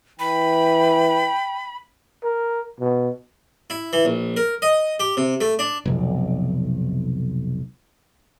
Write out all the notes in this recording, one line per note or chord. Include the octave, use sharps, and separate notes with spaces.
E3 G5 B5
A#4
B2
E4
E3
A#1
A#4
D#5
G4
C3
A3
D4
F1 B1